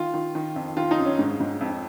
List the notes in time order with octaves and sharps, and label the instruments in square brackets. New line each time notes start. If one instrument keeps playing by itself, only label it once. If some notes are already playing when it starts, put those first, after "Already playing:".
Already playing: [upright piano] D#3 F4
D#3
D#3
F2
D#3 F4
D#4
F#2
C#4
G#2
G#2
F2